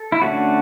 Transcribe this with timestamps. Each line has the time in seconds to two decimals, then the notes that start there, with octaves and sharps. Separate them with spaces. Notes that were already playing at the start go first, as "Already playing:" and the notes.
Already playing: A4
0.12 E4
0.22 D3 A3 C#4 F#4